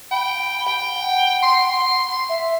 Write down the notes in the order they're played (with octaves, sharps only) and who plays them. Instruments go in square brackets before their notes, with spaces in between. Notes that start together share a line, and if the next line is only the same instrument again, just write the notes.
[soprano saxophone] G5 [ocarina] B5
[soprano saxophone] G5
[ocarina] F#5
[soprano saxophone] C6
[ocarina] E5